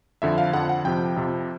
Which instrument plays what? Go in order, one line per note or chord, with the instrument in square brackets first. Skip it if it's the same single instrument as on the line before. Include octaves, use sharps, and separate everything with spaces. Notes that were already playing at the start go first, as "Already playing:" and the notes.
[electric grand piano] F2 D3 F3 E5
F5
F2 D3 F3 F#5
F#5
F2 C3 F3 G5
F2 C3 F3